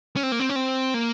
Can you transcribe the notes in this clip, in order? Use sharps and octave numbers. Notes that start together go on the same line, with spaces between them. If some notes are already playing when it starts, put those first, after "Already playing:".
C#4
C4
A#3
C4
C#4
C4
A#3